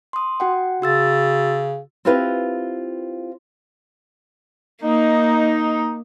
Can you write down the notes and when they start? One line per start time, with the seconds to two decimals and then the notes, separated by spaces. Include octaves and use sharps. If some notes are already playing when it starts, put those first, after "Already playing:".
0.13 C6 D#6
0.40 F#4 F#5 G5
0.82 C#3 F#4 E6 A6
2.05 C4 E4 F4 G4 B4
4.83 A#3 D#4